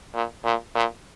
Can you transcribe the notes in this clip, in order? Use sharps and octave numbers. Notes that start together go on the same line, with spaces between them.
A#2
A#2
A#2